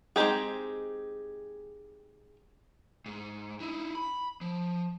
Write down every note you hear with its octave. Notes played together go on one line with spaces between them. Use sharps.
G#3 C4 D#4 G4 G#4
G#2
D#4 E4
B5
F3